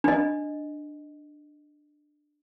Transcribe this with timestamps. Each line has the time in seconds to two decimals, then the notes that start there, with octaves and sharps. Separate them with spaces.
0.04 D4 D#5